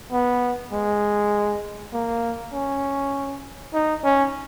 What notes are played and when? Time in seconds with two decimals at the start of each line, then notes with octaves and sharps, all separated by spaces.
0.12 B3
0.72 G#3
1.93 A#3
2.53 C#4
3.74 D#4
4.04 C#4